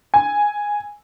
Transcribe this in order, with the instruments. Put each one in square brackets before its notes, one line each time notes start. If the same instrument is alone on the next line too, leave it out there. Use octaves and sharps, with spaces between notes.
[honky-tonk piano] G#5